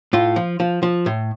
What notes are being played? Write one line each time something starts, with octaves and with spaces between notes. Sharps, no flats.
A2 F4
F3
F3
F3
A2